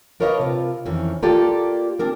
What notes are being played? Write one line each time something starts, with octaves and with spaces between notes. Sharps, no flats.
D4 A#4 B4 C#5 D#5 F5
C3 F4
F2 D#3 E3 C#4
A#3 F4 G4 A4 D5
C4 D4 A#4